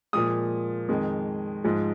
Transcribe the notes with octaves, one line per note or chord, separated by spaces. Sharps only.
A#2 F3 G#3 D#6
F2 D#3 G#3
G#2 F3 G#3